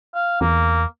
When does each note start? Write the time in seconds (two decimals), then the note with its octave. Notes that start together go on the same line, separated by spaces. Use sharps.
0.14 F5
0.41 E2 A#3